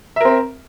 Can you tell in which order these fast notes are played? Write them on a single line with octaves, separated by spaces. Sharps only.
E5 A#4 C4